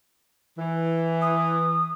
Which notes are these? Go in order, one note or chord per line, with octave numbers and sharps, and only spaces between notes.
E3
D#6